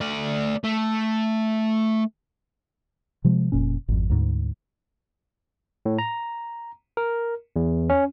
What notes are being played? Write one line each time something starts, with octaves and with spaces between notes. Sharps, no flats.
A3 D5
A3
C3 F3 G#3
F1 A#2 C#4
G#1 F2
D2 G#2
A2
A#5
A#4
E2
C#4